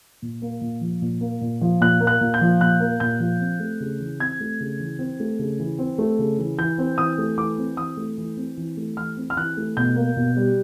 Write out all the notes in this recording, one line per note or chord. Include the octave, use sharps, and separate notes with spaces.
A#2
A#3
A#2
F3
A#2
A#3
A#2
F3
A#2 F#6
A#3
F#6
A#2
G6
F3
A#2 F#6
A#3
A#2 G6
F3
C4
A3
C#3
E3
C4 G#6
A3
C#3
E3
C4
A3
C#3
E3
C4
A3
C#3
E3
E3 G6
C4
E3 D#6
A3
E3 D6
C4
E3 D#6
A3
E3
C4
E3
A3
E3 F6
C4
F6
E3 F#6
A3
B2 G6
A#3
B2
G3